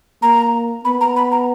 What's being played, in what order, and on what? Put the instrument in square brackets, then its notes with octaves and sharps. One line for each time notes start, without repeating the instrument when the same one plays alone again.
[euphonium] A#3 [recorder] A#5
[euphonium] B3 [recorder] B5
[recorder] A#5
B5
A#5